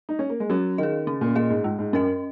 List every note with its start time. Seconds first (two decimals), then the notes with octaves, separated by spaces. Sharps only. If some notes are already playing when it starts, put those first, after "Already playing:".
0.09 D#4
0.19 C#4
0.29 A#3
0.40 G#3
0.50 F#3 C#4
0.78 D#3 G#4 D#5
1.07 C#3 C#4
1.21 A#2
1.35 A#2 G#4 D#5
1.50 G#2
1.64 G#2 G#3
1.79 G#2
1.93 F#2 C#4 A#4 D#5